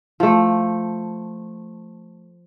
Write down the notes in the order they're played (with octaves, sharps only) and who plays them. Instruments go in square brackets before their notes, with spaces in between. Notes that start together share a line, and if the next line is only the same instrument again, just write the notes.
[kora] F3 A3